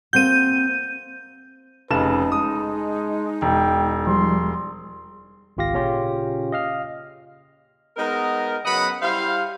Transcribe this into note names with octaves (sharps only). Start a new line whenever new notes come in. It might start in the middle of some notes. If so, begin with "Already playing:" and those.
A#3 C4 F#4 G6 D#7
F1 C#3 D#4 B4 A5 E7
G#3 D#6
E1 G5
F3 G3 C6
G#1 C#2 F4 G4 F5 A#6
A#2 C#3 C#4 F4 G4
D#5 F5 F6
G#3 B3 D#4 A#4
C#3 F#3 B3 D#5 F#5 B5
G3 E4 C5 F5